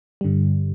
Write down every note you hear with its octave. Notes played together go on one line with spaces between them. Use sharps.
G2 D3 G3